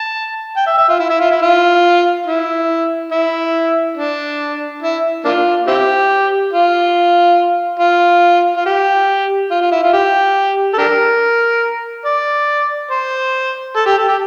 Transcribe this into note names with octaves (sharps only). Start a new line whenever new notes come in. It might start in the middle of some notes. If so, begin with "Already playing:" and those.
Already playing: A5
G5
E5
E5
F4
E4
E4
F4
E4
F4
E4
E4
D4
E4
A#3 D4 F4
C4 E4 G4
F4
F4
F4
G4
F4
F4
E4
F4
G4
A4
D4 G4 A#4
D5
C5
A4
G4
A4
G4